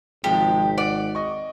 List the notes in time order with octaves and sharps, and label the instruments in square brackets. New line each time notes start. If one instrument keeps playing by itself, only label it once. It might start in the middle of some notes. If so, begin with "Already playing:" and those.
[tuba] G#1 [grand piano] C3 F3 G#3 [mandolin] G4
[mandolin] D5 [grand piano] F#5
[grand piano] D#5 C#6